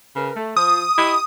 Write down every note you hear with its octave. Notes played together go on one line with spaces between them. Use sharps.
C#3 A#4 B4
A3
F3 D#6
E4 G4 D#5